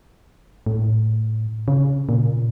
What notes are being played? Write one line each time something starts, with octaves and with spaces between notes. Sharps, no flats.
A2
C#3
A#2